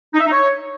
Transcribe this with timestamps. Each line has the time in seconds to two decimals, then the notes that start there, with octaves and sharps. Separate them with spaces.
0.14 D#4
0.20 E5
0.25 D#4
0.31 C#5